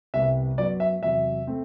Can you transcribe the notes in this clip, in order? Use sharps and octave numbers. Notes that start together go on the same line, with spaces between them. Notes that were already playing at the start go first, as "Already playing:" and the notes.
C2 C3 G3 B3 E5
F#2 F#3 B3 D5
E5
E2 C3 F#3 E5
A3 C4